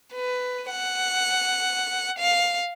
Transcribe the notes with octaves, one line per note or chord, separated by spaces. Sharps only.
B4
F#5
F5